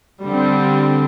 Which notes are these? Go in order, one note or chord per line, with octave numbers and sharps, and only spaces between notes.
D3 G3 C4